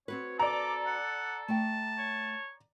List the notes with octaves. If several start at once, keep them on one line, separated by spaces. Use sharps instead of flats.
C4 F#4 B4 C#5
A4 D5 A#5 D6
F#5
A3 G5 A5
C#5